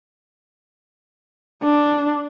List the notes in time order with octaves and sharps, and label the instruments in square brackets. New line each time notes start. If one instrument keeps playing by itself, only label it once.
[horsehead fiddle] D4